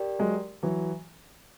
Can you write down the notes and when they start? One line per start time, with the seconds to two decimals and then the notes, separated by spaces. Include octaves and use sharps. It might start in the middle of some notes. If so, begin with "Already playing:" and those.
Already playing: G4 A#4 D5 G5
0.19 F#3 G#3
0.63 E3 F#3